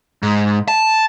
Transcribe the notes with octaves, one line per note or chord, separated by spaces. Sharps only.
G#2
A5